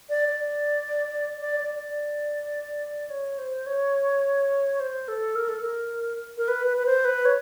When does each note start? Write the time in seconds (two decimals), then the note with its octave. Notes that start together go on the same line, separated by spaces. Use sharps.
0.09 D5
0.28 D5
1.41 D5
1.60 D5
1.79 D5
3.10 C#5
3.38 C5
3.66 C#5
4.80 C5
5.08 A4
5.35 A#4
5.48 A4
5.61 A#4
6.37 A#4
6.48 B4
6.67 B4
6.77 B4
6.86 C5
7.05 B4
7.25 C#5